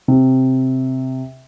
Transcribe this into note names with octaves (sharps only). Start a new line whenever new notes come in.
C3